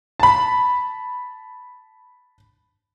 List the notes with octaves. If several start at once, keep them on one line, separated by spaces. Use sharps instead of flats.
A5 B5